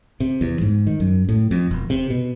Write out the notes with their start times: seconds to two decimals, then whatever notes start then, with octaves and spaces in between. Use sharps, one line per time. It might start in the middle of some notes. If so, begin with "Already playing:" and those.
0.20 C3
0.41 E2
0.61 G#2
0.87 D#3
1.00 F#2
1.29 A2
1.51 F2
1.71 E1
1.90 C3
2.10 B2